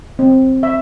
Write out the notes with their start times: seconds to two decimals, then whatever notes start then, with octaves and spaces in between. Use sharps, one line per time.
0.19 C4
0.63 E5